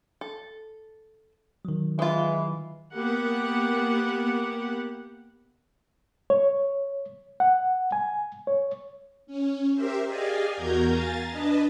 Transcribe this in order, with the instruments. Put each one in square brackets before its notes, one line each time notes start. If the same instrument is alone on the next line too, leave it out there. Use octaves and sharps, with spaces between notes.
[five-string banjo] A4
[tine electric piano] D#3 F#3
[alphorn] E3 [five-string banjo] G#3 F4
[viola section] A#3 B3 G4 F#5
[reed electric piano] C#5
F#5
G#5
C#5
[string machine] C#4
G4 A#4 C5 E5
G4 G#4 D5 D#5 F5 G#5
E2 F#4 A#4 A#5 G6 G#6
F5 G#5 A#5 A6
D4 B4 D#5 A5